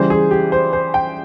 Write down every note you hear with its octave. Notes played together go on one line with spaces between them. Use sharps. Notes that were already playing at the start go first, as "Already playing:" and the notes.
Already playing: C#3 E3 G3 C5
G#4
G4
C5
C5
G5